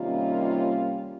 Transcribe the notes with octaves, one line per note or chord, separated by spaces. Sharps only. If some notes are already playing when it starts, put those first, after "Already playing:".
Already playing: C3 D#3 G3 A#3 C#4 F4